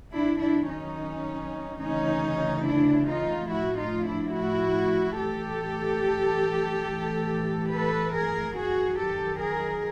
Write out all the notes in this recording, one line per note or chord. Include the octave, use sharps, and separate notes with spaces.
F#2 D#3 D4 E4
D4 E4
C#4 D#4
D2 C#3 E3 C#4 D#4
D4 E4
D#4 F4
A2 F3 E4 F#4
D#4 F4
D4 E4
E4 F#4
A2 E3 G4 A4
A2 E3
A4 B4
G#4 A#4
F#2 D#3 F#4 G#4
G4 A4
G#4 A#4